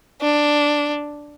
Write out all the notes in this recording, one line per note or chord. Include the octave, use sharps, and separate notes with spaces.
D4